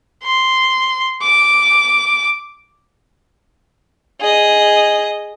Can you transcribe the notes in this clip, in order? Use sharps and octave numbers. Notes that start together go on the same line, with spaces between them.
C6
D6
G#4 D#5